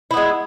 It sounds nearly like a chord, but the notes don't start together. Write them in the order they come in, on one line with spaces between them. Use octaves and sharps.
E4 B3 G#3